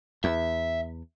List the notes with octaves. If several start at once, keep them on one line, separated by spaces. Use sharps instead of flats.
E2 E5